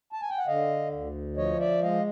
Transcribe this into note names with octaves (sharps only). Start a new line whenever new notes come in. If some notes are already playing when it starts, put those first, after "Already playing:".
A5
G#5
G5
F#5
D3 D#5 F5
D2
F3 C#5 D#5
D5 E5
G#3 D#5 F5